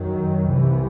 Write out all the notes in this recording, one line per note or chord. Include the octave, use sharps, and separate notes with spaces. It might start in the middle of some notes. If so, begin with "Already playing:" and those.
Already playing: F#2 D#3 F#3
C2 C3 E3